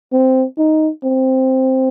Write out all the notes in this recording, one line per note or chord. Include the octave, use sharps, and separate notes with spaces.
C4
D#4
C4